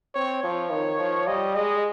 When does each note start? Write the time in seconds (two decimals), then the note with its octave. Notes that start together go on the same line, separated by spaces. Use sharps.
0.14 C4 C#5
0.43 F3 C#5
0.72 D#3
0.99 F3
1.27 G3 D#5
1.55 G#3 D#5